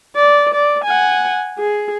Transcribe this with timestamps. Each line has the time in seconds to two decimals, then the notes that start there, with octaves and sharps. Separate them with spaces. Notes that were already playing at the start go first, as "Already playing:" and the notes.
0.16 D5
0.54 D5
0.84 F#5 G#5
1.59 G#4